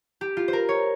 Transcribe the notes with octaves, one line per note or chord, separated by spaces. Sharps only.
G4
F4
C5
A#4
C#5